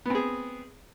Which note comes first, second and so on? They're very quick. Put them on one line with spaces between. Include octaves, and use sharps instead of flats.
B3 C4 G#4